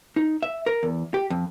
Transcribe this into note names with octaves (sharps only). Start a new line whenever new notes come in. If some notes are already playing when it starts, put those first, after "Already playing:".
D#4
E5
A#4
E2
G4
F2